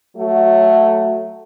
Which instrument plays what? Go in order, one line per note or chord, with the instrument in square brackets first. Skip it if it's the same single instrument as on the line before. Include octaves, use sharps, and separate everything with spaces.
[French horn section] F#3 A3 F#4